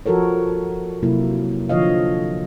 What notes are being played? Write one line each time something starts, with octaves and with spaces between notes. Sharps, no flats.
F3 F#4 A4 A#4 C#5
C3 F#3 A#3 E4
D3 F3 C#5 D#5 F5